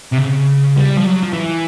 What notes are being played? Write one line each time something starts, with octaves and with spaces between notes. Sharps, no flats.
C3
C#3
G3
F3
F#3
F3
E3